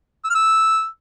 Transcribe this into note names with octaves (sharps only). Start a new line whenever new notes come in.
E6
F6
E6